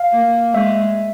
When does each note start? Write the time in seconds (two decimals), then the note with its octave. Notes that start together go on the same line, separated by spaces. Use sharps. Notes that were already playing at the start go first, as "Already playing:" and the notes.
Already playing: F5
0.12 A#3
0.54 G#3 E5